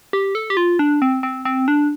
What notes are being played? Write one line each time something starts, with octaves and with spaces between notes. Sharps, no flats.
G4
A4
G4
F4
D4
C4
C4
C4
D4